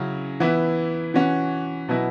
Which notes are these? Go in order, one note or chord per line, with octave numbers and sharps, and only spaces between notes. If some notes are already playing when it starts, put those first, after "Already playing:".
Already playing: C#3 F#3 C#4 E4
E3 B3 E4
E3 C#4 F#4
B2 F#3 B3 E4